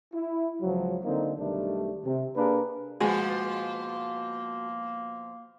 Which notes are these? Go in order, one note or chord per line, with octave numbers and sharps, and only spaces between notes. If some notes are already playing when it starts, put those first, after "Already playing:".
E4
C#2 F3 F#3
D3 A#3 C4 D#4
B1 D#3 G3 A3 D4
C3
A#3 D4 G#4 A#4 B4
B2 F3 G#3 A#3 F#4